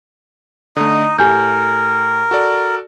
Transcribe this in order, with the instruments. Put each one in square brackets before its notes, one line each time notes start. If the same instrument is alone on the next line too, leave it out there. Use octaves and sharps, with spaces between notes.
[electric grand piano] D3 A3 [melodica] D#4 D#5
[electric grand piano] A2 [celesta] G4 G#5 G6 [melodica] A#4
[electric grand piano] F#4 A4 D5